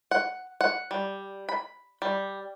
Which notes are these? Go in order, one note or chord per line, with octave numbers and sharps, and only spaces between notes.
F#5
F#5
G3
B5
G3